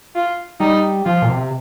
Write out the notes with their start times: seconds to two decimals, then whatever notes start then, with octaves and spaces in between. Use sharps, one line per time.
0.15 F4
0.60 G3 D#4
1.06 F3 F4
1.22 A#2
1.30 C3